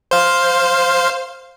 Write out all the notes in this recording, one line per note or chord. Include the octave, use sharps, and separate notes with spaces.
C5 F5